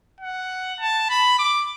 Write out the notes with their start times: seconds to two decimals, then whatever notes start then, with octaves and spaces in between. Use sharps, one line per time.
0.21 F#5
0.80 A5
1.09 B5
1.39 D6